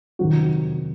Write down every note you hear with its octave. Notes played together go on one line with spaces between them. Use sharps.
C3 D#3 F#3 C4 F#4